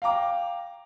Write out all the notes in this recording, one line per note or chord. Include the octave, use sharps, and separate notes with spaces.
F5 G5 A#5 D6